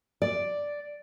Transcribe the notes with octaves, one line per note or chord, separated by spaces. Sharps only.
D5